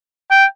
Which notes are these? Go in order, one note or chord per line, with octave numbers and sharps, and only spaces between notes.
G5